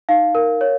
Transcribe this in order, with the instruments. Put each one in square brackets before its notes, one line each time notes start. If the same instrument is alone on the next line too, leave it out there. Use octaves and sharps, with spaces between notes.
[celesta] D#4 F5
A#4
C#5